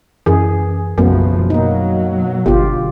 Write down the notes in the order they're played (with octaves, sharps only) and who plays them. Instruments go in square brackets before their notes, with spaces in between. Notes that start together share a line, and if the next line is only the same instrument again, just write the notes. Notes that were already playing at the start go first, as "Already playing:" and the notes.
[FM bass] F#2 [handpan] E3 G#4
[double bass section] F#1 B1 F3 [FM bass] F#2 [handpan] F#3 A3 B3
[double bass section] B2 F#3 [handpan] A#3 D#4
[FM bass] G1 [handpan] D3 F4 G4